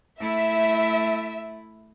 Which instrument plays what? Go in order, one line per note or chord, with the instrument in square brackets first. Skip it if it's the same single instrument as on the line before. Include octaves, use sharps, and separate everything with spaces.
[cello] A3 E4 [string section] E5